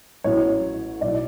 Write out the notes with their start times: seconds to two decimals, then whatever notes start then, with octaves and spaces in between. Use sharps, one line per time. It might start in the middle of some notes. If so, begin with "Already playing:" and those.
0.24 A1 A2 F#3 C#5
1.01 B1 A2 F#3 D5